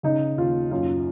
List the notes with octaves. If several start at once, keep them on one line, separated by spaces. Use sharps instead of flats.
C#3 D#4
D#2 F4
F#2 F4